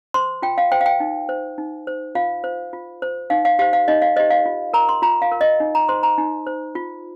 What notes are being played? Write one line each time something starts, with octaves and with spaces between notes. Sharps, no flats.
C5 C6
F4 G5
F5
C5 G5
F5
G5
D#4
C5
D#4
C5
F4 F5
C5
F4
C5
D#4 F5
F5
G4 C5 F5
F5
D#4 D#5
F5
G4 C5 D#5
F5
F4
A#4 A#5
C6
F4 A#5
F5
A#4
D#5
D#4
A#5
C5 C6
A#5
D#4
C5
F4